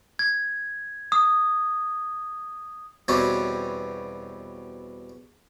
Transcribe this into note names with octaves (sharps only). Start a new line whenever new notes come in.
G#6
D#6
E2 B2 G3 C4 C#4 F#4